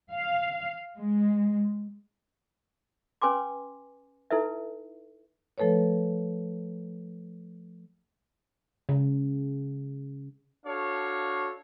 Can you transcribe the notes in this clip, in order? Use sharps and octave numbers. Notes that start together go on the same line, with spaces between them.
F5
G#3
C#4 B4 G#5 C6 D6
D#4 E4 A4 B4 E5
F3 A3 A4 B4 C#5
C#3
D4 F#4 A4 C#5 F5